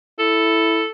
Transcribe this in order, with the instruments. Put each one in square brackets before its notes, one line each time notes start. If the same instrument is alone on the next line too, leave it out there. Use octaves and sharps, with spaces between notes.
[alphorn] E4 [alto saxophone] A4